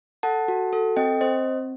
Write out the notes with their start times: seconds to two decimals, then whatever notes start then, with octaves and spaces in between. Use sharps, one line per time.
0.23 A4 F#5 A5
0.48 F#4
0.73 A4
0.96 C4 D#5 G5
1.21 C4 C5 D#5